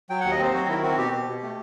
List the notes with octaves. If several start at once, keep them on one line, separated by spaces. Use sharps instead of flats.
F#3 G5
D#2 F#5
D#5
C4 C5
F#3 F#4
D#3 E4
C4 F#4
B2 G4
B2
B2
A3